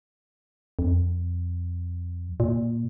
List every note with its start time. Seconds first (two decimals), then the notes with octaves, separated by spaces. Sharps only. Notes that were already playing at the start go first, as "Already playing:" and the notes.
0.79 F2
2.40 A#2